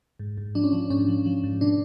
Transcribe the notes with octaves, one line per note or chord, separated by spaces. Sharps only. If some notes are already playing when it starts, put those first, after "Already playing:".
G#2
G#2
F3 D4
C#4
F3 D4
G#2 C#4
F3
F3
G#2
B2 D4